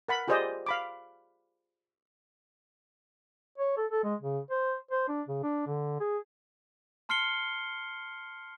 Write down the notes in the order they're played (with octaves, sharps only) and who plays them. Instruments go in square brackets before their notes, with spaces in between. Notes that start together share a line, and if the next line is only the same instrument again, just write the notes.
[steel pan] A#4 F#5 B5
F4 G4 G#4 C5 D5 D#5
F5 B5 D6
[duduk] C#5
A4
A4
G#3
C#3
C5
C5
D4
C#3
D4
D3
G#4
[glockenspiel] A5 C6 F6 C7 C#7 G7